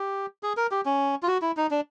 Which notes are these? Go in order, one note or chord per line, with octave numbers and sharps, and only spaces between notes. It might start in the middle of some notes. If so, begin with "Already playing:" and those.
Already playing: G4
G#4
A#4
G4
C#4
F4
F#4
E4
D#4
D4